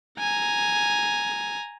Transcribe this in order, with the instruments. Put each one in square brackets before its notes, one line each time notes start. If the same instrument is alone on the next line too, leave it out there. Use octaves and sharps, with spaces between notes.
[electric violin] G#5 A#5